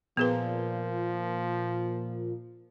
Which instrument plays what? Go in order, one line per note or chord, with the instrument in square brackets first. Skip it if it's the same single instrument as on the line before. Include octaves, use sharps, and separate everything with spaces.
[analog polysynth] A#2 [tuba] F3 [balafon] B3 G#4 B4